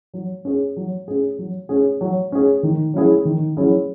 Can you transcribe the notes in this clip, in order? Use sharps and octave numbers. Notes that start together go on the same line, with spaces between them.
F#3
C#4 G#4
F#3
C#4 G#4
F#3
C#4 G#4
F#3
C#4 G#4
D#3
F#3 C#4 E4 G#4
D#3
F#3 C#4 E4 G#4